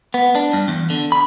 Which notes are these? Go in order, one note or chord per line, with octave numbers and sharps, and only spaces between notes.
B3
D4
G2
E2
D3
B5